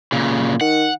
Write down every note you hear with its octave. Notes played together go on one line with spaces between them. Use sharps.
A#2 C#3
D#3 F#5